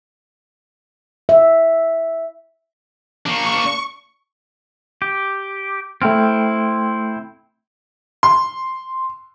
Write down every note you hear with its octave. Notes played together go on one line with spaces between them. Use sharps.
E5
A#3 D4 C#6
G4
A3 C4 E4 G5 F6
C6